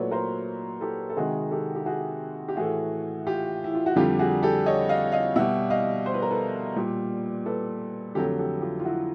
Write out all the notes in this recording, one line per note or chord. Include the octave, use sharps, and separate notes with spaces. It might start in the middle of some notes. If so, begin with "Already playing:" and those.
Already playing: A#2 F#3 A3 B4 C#5 D5
A#4 C5
G4 A4
A4
C3 D#3 G#3 F#4 G#4
G4 A4
G4
F#4 G#4
G4
A2 E3 A3 F#4 G#4
F4 G4
E4
F4
F#4
F2 D3 G3 F4 G4
F#4 G#4
G4 A4
C#5 D#5
D#5 F5
D#5 F5
B2 G3 E5 F#5
D#5 F5
C5
B4
A#4
A4 B4
A#2 G3
A4 B4
F2 D3 F#3 A3 G4 A4
G4 A4
F4 G4
F4
E4 F#4